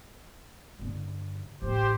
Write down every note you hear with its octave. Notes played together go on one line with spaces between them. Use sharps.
G2 D3
A1 E3 G4 C5